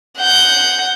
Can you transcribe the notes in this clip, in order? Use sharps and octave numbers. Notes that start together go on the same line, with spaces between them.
F#5 G6